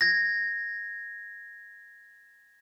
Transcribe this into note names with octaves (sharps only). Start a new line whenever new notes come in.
G#6 A#6